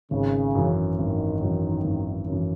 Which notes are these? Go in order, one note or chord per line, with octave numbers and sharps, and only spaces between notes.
G#1 C#3
F#2 E3
G#1 D#3
F#2 E3
G#1
F#2
E3